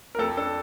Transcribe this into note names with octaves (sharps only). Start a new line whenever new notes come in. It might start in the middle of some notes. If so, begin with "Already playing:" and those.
A#4
F2 A4
D4 A4